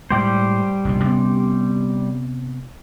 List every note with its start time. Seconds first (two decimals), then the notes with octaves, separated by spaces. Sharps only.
0.11 A2 G3 G#3 G4 C5
0.85 F1 A#1 B2
1.04 C3 B3 C#4